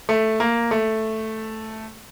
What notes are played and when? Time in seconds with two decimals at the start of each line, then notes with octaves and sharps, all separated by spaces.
0.09 A3
0.40 A#3
0.71 A3